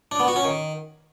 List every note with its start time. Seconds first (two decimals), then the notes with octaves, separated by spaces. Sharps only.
0.12 D4
0.20 B3
0.28 F#4
0.36 C#4
0.44 D#3